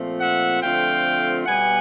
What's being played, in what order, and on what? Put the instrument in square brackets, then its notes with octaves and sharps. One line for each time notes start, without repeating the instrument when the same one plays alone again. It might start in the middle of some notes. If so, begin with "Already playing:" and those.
Already playing: [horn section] A#2 F3 A3 C4 F4
E5 F#5
D3 F3 A3 C4 F4 F5 G5
B2 G3 B3 F#5 G#5